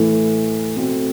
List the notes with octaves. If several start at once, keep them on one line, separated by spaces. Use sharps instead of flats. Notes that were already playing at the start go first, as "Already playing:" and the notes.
Already playing: A2 E3 A3 E4
B2 A3 C4